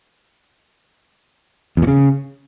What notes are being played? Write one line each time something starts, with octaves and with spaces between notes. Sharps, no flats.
E2
A#2
C#3